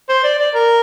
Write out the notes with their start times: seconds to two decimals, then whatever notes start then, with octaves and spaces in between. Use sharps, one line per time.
0.09 C5
0.23 D5
0.39 D5
0.54 A#4